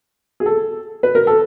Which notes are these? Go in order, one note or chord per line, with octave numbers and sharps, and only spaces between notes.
G#4
A4
B4
A#4
A4